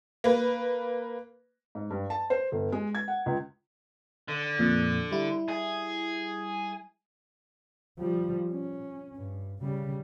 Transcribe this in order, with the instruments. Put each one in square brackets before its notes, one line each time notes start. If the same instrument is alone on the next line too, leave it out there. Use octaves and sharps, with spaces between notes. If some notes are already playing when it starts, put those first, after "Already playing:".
[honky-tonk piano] A#3 B4
[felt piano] G#2
G2
A5
C5
G1
G#3
G#6
F#5
C#2
[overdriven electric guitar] D3
[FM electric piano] F2 A#2
G3 E4
[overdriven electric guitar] G#4
[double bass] F3 G3
C#4
G2
C#3 G3